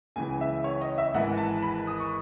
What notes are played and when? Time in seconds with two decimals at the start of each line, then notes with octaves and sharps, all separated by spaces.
0.16 C#2 C#3 E3 G#5
0.41 E5
0.64 C#5
0.82 D#5
0.98 E5
1.14 G#1 G#2 E3 F#5
1.38 A5
1.63 B5
1.87 D#6
2.00 C#6